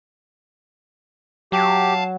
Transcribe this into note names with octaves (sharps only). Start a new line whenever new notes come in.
F#3 G4 F5 A5